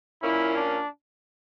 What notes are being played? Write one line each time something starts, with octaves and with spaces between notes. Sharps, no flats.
A#2 A#3 C#4 E4
D4